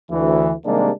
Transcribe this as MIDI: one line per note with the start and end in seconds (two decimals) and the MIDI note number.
0.10 0.52 38
0.10 0.52 52
0.65 0.90 48
0.65 0.90 51
0.65 0.90 55
0.65 0.90 56
0.65 0.90 58
0.65 0.90 62